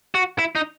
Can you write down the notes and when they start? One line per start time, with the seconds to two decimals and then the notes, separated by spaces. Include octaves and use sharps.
0.15 F#4
0.39 E4
0.55 D#4